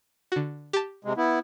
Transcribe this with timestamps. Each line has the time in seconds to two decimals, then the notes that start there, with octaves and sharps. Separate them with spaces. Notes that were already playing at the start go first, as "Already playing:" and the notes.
0.32 D3 F#4
0.73 G4 A5
1.05 C3 G#3
1.17 B3 E4